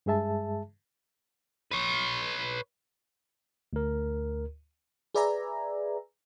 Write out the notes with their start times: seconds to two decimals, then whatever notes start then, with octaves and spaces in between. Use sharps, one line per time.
0.06 G2 G#3 G#4 E5 A5
1.71 B4 C#5
3.73 D2 A#4
5.15 G#4 B4 D5 E5 G#5 A#5